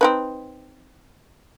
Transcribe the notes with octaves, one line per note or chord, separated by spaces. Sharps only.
C4 D#4 B4